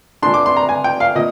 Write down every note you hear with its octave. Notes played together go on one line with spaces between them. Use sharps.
A#2 G#3 D4 C6
D6
C6
A#5
G#5
G5
F5
A#2 D#5